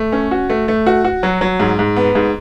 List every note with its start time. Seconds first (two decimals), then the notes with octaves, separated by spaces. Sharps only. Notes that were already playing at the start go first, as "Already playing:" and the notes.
Already playing: A3
0.12 C#4
0.31 F#4
0.50 A3
0.68 A3
0.86 F#4
1.05 F#4
1.23 F#3
1.41 F#3
1.60 G#2
1.79 G#2
1.96 B3
2.15 G#2